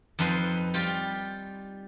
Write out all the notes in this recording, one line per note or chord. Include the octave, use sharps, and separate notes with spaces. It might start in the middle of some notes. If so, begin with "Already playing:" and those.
F2 F3 D#4 B4 C6
G3 F4 G4